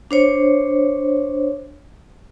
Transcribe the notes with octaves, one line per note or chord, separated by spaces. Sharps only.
D4 C5 C#5